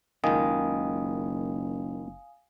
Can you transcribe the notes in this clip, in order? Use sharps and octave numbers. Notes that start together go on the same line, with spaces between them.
F#1 C#2 D#3 F5 G#5 D#6